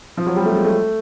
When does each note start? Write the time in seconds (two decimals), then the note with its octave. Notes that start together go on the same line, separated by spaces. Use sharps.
0.17 F3
0.26 F#3
0.36 G3
0.45 A3
0.55 G#3
0.64 A3